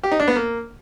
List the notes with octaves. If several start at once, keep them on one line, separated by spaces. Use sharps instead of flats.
G4
D#4
D4
B3
A#3